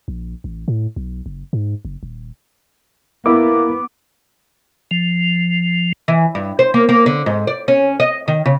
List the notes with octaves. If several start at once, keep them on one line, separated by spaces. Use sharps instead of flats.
A#1
A1
A2
B1
F#1
G#2
F#1
D#1
A#3 B3 E4 D6
F3
E3
G2
C5
A#3
A#3
D3
G#2
D5
C#4
D#5
D#3
C#3